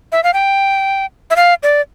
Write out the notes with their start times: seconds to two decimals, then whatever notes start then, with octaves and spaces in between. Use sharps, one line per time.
0.12 E5
0.24 F5
0.34 G5
1.30 E5
1.36 F5
1.63 D5